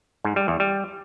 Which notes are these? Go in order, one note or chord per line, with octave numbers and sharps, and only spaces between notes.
G#2
G3
E2
G3